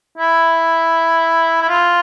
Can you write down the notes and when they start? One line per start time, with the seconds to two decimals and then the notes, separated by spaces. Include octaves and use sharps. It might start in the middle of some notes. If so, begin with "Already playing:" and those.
0.18 E4
1.62 E4
1.69 F4